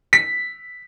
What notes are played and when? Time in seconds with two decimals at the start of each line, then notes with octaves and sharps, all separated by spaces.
0.13 B6